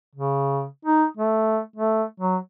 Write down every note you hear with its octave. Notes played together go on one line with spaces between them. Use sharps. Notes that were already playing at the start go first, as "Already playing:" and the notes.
C#3
D#4
A3
A3
F#3